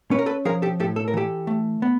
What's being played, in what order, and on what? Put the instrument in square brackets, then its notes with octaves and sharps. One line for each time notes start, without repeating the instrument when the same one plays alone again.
[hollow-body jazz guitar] C#4 B4
A#4
A4 B4
F3 G#4 A#4
G4 A4
A2 G4 A4
A4
A#4
E3 G4 A4
A3
B3